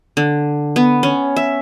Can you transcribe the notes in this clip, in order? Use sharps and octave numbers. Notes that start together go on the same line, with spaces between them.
D3
B3
C#4
E5